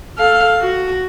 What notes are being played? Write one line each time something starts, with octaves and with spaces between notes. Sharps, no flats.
A4 F5
F#4